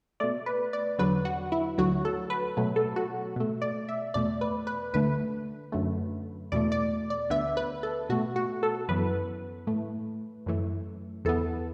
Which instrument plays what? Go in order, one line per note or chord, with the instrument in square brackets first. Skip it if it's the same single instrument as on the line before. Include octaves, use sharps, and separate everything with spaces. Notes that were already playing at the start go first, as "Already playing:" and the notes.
[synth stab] B2 A3 D5
B4
D5
E2 D3 F#3 B4
F#4
E4
D2 D3 F#3 F#4
A4
B4
B2 F#3 A3
A4
F#4
B2 A3
D5
E5
E2 B2 A3 D5
B4
B4
D2 D3 A3 B4
F#2 D3 A3
E2 B2 A3 D5
D5
D5
D2 D3 B3 E5
B4
A4
B2 A3 F#4
F#4
A4
F#2 E3 B3 B4
A2 A3
F#2 E3 A3
E2 E3 B3 A4